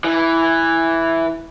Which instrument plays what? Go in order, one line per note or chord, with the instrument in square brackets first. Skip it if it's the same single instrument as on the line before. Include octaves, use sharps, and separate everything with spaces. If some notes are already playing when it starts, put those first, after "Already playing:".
[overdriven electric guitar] E3